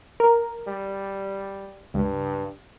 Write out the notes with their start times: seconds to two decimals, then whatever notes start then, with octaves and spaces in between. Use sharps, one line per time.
0.20 A#4
0.68 G3
1.94 C#2 G2